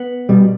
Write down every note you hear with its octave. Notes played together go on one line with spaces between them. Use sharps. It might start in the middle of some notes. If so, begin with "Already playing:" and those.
Already playing: B3
B2 G3